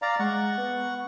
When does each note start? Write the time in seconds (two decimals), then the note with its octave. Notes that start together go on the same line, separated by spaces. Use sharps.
0.02 D5 F5 A#5 A6
0.19 G#3 F#5 C#6
0.58 B3